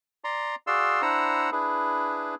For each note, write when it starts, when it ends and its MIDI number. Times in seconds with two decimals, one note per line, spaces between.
0.24 0.55 74
0.24 0.55 82
0.24 0.55 84
0.67 1.02 66
0.67 1.02 68
0.67 1.02 74
0.67 1.02 77
0.67 1.02 84
0.67 1.02 88
1.02 1.50 62
1.02 1.50 64
1.02 1.50 72
1.02 1.50 78
1.02 1.50 82
1.02 1.50 88
1.52 2.35 62
1.52 2.35 64
1.52 2.35 68
1.52 2.35 71